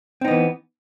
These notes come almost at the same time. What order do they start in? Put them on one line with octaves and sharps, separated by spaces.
C4 D#4 B3 E3